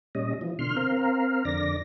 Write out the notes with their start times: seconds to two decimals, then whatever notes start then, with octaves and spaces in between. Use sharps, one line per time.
0.15 A#2 G3 C#4 D#5
0.41 E3 F3
0.59 B2 D3 C6 F6
0.77 C4 A#4 F5
1.45 F2 D3 D5 A#6